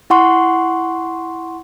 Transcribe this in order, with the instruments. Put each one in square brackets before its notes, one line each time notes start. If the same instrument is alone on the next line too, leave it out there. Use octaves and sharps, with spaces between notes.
[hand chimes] E4 F#5 C6 C#6